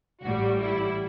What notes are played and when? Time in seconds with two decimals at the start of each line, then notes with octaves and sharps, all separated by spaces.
0.22 A1 A2 G3 F#4
0.61 E4